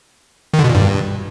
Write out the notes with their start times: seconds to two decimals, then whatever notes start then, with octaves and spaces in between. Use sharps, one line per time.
0.54 D#3
0.59 D3
0.64 B2
0.69 A#2
0.75 G2